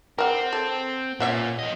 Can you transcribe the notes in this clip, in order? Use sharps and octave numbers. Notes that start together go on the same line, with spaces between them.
C4 A#4 F#5
A4
A#2 C#4 E5 F#5
F3 D#5